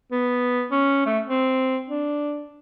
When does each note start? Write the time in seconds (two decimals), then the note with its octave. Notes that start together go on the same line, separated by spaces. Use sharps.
0.12 B3
0.71 C#4
1.07 A3
1.27 C4
1.89 D4